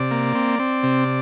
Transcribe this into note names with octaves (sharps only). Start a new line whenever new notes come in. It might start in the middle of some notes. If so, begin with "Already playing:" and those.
Already playing: C3 D5
A#3
C4
C4
C3